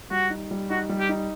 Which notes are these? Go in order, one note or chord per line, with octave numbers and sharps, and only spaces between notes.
G3 F#4
D#4
G3
D#4 F#4
G3
G4
D#4